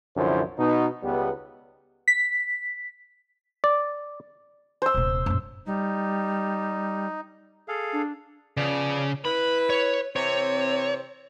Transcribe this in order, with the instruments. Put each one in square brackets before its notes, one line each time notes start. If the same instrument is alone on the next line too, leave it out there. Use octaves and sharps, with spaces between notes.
[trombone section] C2 F#2 D3 F3 E4 C5
B2 D#4
C#2 G3 B3
[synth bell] B6
[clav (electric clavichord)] D5
[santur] C5 E6
[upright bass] D#1 C3
F#2 A#2
[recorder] G3 [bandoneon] D#4
[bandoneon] G#4 A4 F5
[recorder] D4
[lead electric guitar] C#3 [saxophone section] F3 B3 D5
[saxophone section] E4 B4 [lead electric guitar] B5
[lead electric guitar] C#5
[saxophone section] C3 E3 C4 [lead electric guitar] C#5